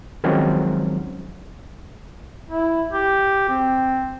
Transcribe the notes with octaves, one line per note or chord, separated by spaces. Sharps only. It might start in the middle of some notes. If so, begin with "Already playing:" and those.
D#3 F3 F#3 G#3 C4 C#4
E4
G4
C4